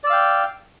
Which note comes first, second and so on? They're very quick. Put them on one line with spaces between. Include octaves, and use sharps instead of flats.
D5 E6 F5 G5